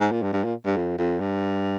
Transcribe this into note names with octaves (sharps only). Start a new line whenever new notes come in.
G#2
A#2
G2
G2
A#2
G2
F2
F2
G2